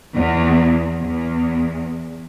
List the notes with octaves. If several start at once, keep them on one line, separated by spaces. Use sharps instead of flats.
E2
E2